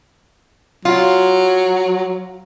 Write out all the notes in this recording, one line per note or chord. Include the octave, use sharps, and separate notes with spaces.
F#3 F4